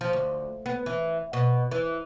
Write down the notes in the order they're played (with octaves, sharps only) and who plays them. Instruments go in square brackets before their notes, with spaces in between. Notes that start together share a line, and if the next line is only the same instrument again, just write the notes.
[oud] F3
D2
B3
E3
B2
E3